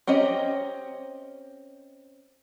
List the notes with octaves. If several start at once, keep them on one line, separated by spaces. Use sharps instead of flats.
C4 C#4 G4 D#5 A#5